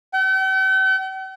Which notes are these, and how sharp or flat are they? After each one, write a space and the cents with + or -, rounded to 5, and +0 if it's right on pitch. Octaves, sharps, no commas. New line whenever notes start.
G5 -45